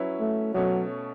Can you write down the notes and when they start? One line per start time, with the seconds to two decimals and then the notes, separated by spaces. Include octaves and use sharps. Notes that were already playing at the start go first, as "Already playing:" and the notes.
Already playing: F#3 C#4 E4 B4
0.20 A3
0.55 B2 F#3 A3 C#4